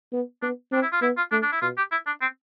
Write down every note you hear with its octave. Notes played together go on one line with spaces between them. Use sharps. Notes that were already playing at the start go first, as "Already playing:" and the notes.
B3
B3 D4
C4 D4
E4
F4
B3 E4
F4
A3 D4
D4
E4
B2 F4
G4
E4
D4
C4